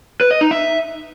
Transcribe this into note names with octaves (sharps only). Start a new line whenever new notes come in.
B4
D#5
D#4
E5